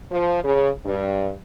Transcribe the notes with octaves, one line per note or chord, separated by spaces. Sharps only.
F3
C#3
G2